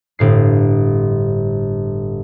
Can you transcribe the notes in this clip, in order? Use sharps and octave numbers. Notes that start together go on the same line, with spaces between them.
G1 A2 C7